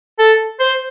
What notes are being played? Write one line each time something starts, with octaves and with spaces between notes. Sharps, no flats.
A4
C5